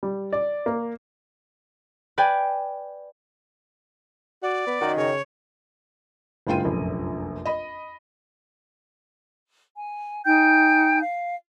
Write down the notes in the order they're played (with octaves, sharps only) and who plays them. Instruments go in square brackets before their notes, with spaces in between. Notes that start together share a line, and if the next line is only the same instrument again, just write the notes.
[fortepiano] G3
D5
A#3
[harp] B4 D5 G5 G#5
[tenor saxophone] F#4 [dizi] D5
[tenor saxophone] B3
[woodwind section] F#2 D#3 [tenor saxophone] F#4
[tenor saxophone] C#3 [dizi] C#5
[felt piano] F#1 G2 G#3 F4 G5 D#7
F1 A#1 F#2
D#5 B5
[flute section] G#5
D#4 G5 G#5 G6
F5